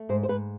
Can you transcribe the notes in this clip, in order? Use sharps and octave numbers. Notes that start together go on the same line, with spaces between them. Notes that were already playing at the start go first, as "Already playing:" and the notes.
Already playing: A3
G#2 C5
C5
G#2 B4